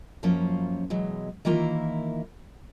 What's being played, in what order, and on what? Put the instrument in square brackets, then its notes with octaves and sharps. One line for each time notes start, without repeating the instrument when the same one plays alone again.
[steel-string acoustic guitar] F#2 F3 F#3 A#3 C#4 F4
B2 E3 F#3 G#3
D#3 E3 A#3 E4 F4 A#4